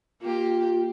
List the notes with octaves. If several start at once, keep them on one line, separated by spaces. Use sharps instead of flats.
A#3 F4 G4